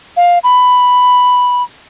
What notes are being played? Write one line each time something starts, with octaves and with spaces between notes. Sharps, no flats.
F5
B5